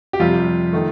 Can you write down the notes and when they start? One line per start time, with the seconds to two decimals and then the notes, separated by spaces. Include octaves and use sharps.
0.13 G4
0.20 F2 C3 G3 F4
0.73 D#3 A3